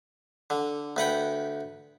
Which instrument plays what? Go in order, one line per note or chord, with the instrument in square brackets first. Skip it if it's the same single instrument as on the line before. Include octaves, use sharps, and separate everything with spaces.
[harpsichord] D3
D2 B4 F#5 G5